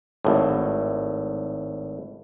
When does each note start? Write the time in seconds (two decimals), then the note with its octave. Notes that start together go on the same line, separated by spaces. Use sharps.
0.25 G#1 A2